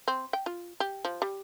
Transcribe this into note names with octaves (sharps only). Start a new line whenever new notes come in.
C4
G5
F4
G4
F3
G3